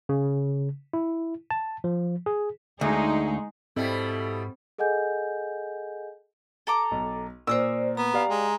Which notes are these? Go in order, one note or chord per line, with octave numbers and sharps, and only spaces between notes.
C#3
E4
A5
F3
G#4
D2 G#3 D#4 G#4
G#2 B2 G3 C4 E4 A4
G#4 A4 D#5 F#5 G#5 G6
A4 A#5 D6
B1
A#2 A#4 C5 D5 D#6 E6
B3 A#5
G4 D5 F5
G#3